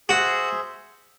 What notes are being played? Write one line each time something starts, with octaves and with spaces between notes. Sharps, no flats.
F#4 G#4 C5 E5